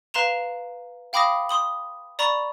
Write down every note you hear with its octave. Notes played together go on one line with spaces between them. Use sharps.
B4 F5 A#5 C6 E7 F7
F5 G5 B5 D6 D#6 A#6
C6 D#6 F#7
D5 A#5 B5 C#6 A6 F#7